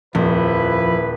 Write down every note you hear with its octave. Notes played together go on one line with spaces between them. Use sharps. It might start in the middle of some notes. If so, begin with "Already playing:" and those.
D#1 F2 F3 E4 B4